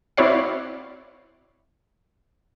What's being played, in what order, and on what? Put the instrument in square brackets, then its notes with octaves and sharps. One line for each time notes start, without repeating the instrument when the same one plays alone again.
[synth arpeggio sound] C4 E4 F#4 C#5 D5 F5